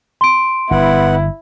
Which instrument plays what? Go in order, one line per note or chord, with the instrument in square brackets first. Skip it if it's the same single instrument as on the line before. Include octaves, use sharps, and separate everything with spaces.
[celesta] C6 D7
[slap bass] G1 [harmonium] B3 F#5 [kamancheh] E4